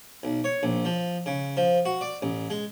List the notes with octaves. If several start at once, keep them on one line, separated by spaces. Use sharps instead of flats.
B1
C#5
A#1
F3
C#3
F3
F#4
D5
A1
G#3